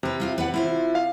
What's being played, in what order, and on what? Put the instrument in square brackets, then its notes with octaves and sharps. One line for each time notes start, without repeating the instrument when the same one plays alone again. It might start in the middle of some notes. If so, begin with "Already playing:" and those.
[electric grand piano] C3 [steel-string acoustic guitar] A#4 B4
[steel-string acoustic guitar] E4 F4 G4
B4 D5 F#5
E4 F4 C5
[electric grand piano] F5